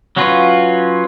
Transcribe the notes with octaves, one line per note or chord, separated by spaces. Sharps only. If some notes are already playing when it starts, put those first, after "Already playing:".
F#3 C#4 F4 B4